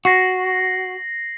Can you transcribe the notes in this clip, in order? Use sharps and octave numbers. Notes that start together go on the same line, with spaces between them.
F#4 A#6 C7 F#7